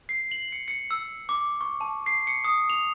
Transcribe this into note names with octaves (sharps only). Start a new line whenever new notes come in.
C7
F#7
C#7
C#7
E6
D6
C#6
A5
C7
C#7
D#6
F7